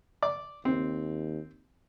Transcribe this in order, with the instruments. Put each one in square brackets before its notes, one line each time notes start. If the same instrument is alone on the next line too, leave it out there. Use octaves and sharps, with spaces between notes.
[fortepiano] D5 D6
[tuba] D#2 [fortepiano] C4